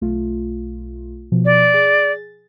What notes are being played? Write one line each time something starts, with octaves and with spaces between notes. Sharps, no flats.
B1 A3 F4
B2 F3
D5
G#4 A6